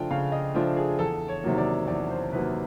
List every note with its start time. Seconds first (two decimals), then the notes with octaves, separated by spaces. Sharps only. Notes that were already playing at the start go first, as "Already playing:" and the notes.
Already playing: C#3 F3 A3 D4 F4 G5
0.10 C#3 F5
0.32 D#5
0.54 F3 A3 D4 F4
0.77 G#4
0.99 E2 A4
1.28 C#5
1.43 C3 D#3 F#3 A#3
1.58 D5
1.88 E2 D5
2.10 C5
2.32 C3 D#3 F#3 A#3 B4